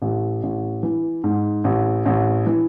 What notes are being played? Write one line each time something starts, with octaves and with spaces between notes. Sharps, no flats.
A1
A1
E3
G#2
A1
A1
E3